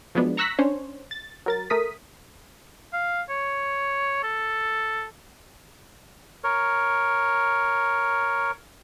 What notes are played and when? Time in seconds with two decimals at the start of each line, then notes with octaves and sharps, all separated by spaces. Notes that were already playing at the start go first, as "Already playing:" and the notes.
0.15 F3 F#3 G#3 B3 D4
0.37 A#5 C#6 E6 F#6 A#6 B6
0.59 C#4 D4 C5 C#5
1.11 A6
1.46 F#3 A#4 A6
1.70 A3 A#4 D#6 B6
2.93 F5
3.30 C#5
4.24 A4
6.44 A#4 C#5